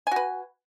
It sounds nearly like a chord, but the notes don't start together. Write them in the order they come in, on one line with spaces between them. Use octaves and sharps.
G#5 F#4 B4